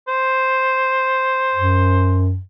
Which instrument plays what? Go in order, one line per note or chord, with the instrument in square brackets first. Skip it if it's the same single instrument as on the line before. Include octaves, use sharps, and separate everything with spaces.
[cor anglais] C5
[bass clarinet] F#2